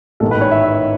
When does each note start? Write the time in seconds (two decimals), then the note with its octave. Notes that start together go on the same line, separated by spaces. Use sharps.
0.20 A1 G#2 D#3 A4
0.31 B4
0.41 C#5
0.51 E5
0.62 E5